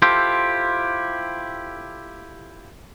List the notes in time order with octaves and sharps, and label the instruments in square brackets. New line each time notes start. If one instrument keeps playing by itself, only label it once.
[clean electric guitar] E4 F4 G4 A4 C5